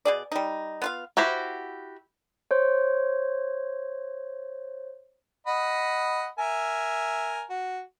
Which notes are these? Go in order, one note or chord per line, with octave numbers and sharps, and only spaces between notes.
B2 G#4 D5
G3 D#4
B3 F4 F5
E4 F#4 G4 C5
C5 C#5
D#5 F#5 B5
A#4 E5 G#5
F#4